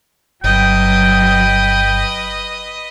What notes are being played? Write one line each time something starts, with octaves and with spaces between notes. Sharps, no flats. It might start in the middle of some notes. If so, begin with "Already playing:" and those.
G1 F#3 B4 D#5 G5